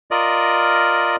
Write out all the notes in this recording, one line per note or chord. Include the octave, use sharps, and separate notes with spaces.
F4 A#4 D5 D#5